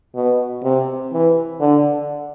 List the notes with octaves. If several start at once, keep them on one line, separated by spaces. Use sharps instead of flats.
B2
C3
E3
D3